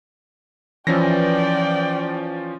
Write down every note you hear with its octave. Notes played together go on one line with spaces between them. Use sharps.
E3 F3 C#4 D5 G5 A#6